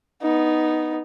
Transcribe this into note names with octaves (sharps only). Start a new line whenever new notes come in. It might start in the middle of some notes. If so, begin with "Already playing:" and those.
B3 D#4